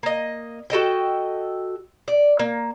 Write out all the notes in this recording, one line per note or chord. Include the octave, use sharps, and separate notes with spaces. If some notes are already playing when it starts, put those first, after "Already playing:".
A#3 D#5
F#4 A4 D#5 G5
D5
A#3